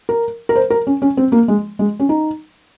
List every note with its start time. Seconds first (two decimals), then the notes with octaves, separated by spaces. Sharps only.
0.09 A#4
0.49 A#4
0.56 C5
0.70 A#4
0.87 C#4
1.02 C#4
1.17 C4
1.32 A#3
1.48 G#3
1.79 G#3
2.00 C#4
2.09 D#4